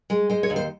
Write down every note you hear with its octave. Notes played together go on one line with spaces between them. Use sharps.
G#3
G#3 C5
C#5
D#2
C5